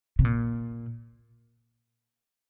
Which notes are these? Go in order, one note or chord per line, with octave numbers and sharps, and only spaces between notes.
C3
A#2